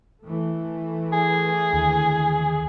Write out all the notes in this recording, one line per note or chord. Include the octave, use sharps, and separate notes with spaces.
E3 A3
G#4
D#2 D3